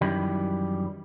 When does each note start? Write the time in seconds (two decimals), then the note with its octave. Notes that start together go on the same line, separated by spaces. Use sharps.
0.01 F#2 D#3 E3 G3